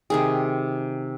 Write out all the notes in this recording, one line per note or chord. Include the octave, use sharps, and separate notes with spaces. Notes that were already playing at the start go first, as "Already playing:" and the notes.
C3 D#3 G#4